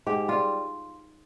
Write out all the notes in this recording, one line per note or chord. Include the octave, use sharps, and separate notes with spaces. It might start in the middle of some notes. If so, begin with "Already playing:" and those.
G#2 G4
G3 F4